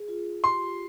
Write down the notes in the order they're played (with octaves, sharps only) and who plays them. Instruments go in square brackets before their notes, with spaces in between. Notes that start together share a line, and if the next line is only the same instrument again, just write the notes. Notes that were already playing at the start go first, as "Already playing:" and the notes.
Already playing: [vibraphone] G#4
F4
[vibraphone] G4 [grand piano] C6